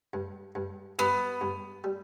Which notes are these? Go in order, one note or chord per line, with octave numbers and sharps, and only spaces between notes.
G2
G2
G2 B3
G2
G3